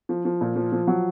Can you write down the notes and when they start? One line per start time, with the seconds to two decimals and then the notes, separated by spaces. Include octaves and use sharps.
0.09 F3
0.25 F3
0.41 A#2
0.56 F3
0.72 F3
0.87 F#3